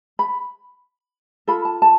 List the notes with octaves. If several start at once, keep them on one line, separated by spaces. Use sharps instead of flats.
B5
F4 A4 B5
A5
A5